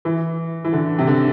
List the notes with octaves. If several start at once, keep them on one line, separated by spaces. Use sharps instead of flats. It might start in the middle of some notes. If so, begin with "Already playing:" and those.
E3
E3
D3
C3
D3